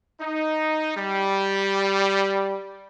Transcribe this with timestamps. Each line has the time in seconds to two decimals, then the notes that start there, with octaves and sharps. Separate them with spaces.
0.20 D#4
0.95 G3